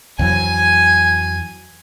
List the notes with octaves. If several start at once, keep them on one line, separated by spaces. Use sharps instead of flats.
F2 E3 F#3 G#5